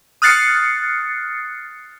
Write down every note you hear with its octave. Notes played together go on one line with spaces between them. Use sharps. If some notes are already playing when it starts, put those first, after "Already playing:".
D#6 F6 F#6 A6 C7 C#7